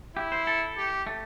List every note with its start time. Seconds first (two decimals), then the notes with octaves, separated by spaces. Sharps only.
0.16 E4 G4
0.32 C5
0.47 A4
0.77 G4
1.07 A3